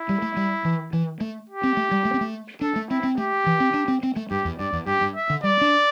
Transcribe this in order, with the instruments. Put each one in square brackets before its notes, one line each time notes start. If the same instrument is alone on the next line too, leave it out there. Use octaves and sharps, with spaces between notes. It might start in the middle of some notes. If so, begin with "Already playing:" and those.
Already playing: [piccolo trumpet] E4
[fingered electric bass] G3
A3
G3
E3
E3
A3
[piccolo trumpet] G4
[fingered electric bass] C4
A3
G3
A3
C4
A3
[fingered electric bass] D4 [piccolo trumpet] A4
[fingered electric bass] A3
[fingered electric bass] C4 [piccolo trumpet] E4
[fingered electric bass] C4
[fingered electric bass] A3 [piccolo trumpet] G4
[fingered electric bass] E3
C4
D4
C4
C4
A3
[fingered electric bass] G2 [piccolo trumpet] G4
[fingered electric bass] E2
[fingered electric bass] G2 [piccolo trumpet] D5
[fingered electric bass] E2
[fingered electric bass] G2 [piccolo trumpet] G4
[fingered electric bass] G2
[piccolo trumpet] E5
[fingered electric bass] D3
[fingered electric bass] G3 [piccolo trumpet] D5
[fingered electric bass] D4